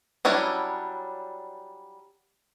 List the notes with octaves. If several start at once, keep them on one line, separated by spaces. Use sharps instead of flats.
F#3 G3 C#4 D4 E4